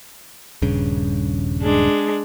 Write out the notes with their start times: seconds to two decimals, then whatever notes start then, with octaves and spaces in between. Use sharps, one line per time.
0.62 D#1 G2 C#3
1.63 G#3 D4